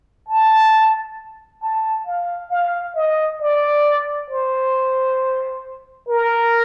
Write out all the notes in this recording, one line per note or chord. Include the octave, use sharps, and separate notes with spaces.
A5
A5
F5
F5
D#5
D5
C5
A#4